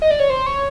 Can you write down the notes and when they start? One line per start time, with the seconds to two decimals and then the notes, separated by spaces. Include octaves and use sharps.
0.02 D#5
0.11 D5
0.20 C#5
0.30 C5
0.46 C#5